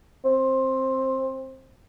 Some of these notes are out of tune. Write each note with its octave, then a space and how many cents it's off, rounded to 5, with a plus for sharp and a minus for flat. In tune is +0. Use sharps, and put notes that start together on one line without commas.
C4 +15